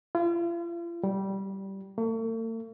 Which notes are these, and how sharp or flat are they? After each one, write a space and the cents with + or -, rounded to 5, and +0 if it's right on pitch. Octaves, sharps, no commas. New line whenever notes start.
F4 -40
G3 -15
A3 +45